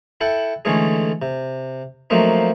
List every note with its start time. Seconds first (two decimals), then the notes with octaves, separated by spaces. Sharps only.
0.21 E4 A4 F#5 G5
0.65 D3 E3 G#3 A3 C#4 G#4
1.22 C3
2.10 F3 F#3 A3 A#3 C4 D#4